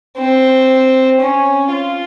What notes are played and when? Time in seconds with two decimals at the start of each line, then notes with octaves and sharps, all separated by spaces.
0.17 C4
1.20 C#4
1.72 F4